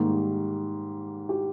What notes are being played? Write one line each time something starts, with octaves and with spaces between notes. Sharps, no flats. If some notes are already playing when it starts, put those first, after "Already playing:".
Already playing: G#2 D#3 G3 A#3 G4
G4